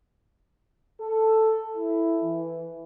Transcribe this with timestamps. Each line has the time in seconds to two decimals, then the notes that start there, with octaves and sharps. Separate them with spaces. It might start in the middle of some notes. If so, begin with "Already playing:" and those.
1.00 A4
1.76 E4
2.23 E3